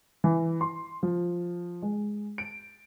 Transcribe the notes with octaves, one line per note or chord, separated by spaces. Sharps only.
E3
C6
F3
G#3
D7